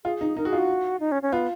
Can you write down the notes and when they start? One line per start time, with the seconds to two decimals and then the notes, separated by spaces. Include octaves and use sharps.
0.05 F4 G#4
0.21 D#4
0.37 D#4 A#4
0.45 F#4 G#4
0.53 F4
0.58 F#4
1.00 D#4
1.12 C#4
1.22 C#4
1.32 B3 F4